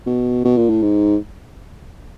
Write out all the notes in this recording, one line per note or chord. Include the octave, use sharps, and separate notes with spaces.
B2
B2
A#2
A2
G#2